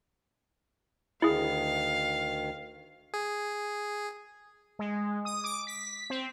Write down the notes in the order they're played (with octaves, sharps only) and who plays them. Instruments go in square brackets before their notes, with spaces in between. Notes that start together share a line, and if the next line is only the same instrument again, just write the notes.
[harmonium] D2 D#3 [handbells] E4 G#4 [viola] F5
[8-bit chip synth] G#4
[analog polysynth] G#3
D#6
D6
B6
C4